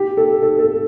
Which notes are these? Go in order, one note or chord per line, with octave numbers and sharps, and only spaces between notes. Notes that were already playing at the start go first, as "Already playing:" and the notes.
Already playing: G4
A4
A4
A4